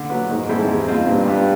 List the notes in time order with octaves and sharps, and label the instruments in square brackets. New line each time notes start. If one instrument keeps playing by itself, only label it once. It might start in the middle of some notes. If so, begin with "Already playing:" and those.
Already playing: [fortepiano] D3
F#3 B3
[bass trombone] G#2 [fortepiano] D#3
[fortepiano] G3 C4 E4 A4
E2
B2 G3 C4 F4
[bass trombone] G2 [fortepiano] A#2
[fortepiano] G3 B3